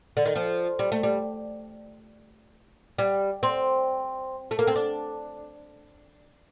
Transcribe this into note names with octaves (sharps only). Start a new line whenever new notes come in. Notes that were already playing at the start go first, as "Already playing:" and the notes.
D3
D#3
F3
G3
A3
G3
G3
C4
A3
A#3
C4
D4